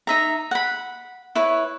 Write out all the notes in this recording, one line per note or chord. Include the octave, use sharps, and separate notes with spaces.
D#4 E5 A#5
F#5 B5
E4 B4 C#5